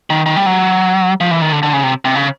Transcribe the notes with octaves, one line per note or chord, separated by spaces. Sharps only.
D#3
D#3
G3
F#3
F3
E3
D#3
D3
D3
C#3
C3
C3
C#3